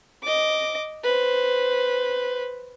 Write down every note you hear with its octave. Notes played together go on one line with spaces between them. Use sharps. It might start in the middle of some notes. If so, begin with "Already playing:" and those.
D#5 D6
B4 C5